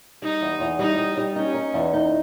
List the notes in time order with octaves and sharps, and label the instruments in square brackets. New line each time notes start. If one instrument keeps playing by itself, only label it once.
[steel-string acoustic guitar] G3 [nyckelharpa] D#4
[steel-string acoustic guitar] E2
E2
[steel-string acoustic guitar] G3 [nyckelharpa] D#4
[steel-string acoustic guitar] G3
G3
[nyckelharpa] C#4 [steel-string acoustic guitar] D#4
[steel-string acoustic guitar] D#4
E2
D#4